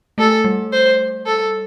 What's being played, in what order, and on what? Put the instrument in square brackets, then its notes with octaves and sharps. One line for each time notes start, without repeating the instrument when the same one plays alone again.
[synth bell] A3 [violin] A4
[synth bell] G3
[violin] C5
A4